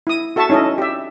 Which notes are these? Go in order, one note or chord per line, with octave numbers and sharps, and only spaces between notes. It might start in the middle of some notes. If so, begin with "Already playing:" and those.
E4 D#6
F#4 A4 E5 A5 C#6
C#4 D#4 E4 A4 D#5
G4 E5